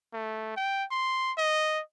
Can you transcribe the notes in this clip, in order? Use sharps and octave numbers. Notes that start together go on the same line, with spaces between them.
A3
G5
C6
D#5